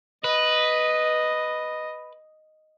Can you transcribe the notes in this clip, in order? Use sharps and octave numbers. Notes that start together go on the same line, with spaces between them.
B4 D#5